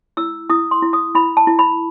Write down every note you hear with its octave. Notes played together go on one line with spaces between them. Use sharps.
E4 E6
E4 D#6
C6
E4
D#6
E4 B5
A5
E4
B5